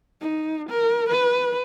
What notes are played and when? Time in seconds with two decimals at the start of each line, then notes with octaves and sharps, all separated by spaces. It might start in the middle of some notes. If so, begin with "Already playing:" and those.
0.21 D#4
0.70 A#4
1.09 B4